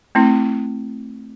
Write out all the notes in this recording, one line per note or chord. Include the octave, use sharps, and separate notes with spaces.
A3 C4 E4